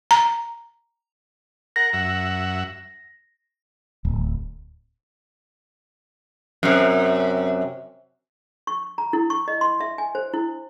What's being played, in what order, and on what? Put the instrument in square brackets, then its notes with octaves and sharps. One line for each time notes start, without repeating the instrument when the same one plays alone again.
[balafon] A#5
[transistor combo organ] A#4 F#5 [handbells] A#6
[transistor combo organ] F#2 E5 F#5
[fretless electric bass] D1
[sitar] F#2 C3
[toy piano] C#6
A#5
E4
C#6
D#5
C6
E5
G#5
C5
E4